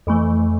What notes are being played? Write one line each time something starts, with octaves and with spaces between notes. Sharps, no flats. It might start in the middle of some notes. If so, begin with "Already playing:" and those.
F2 E3 A3